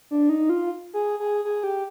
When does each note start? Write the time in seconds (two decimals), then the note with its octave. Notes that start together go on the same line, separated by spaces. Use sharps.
0.11 D4
0.29 D#4
0.49 F4
0.94 G#4
1.20 G#4
1.45 G#4
1.64 G4